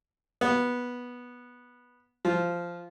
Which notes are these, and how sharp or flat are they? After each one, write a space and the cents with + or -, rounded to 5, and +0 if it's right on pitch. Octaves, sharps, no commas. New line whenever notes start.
B3 -10
F3 -10